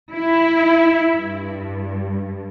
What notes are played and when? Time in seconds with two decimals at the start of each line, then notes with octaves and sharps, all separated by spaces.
0.12 E4
1.14 G2